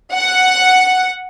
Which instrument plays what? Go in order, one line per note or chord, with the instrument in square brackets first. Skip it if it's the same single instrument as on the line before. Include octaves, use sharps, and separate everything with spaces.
[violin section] F#5